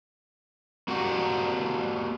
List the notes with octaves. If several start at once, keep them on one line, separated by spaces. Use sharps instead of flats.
A#3 F#4 G4 F#5